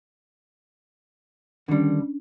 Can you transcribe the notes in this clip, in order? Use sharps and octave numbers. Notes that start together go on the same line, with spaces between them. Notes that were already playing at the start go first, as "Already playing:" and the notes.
D3 D#3 G3 C#4 D4